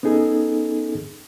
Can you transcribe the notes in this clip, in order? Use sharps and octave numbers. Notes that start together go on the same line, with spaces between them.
B3 C#4 D#4 G#4 A4